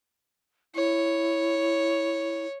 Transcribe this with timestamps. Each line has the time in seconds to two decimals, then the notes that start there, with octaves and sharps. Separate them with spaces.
0.75 E4 C#5